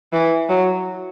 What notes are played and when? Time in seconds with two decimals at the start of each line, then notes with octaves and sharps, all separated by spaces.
0.13 E3
0.49 F#3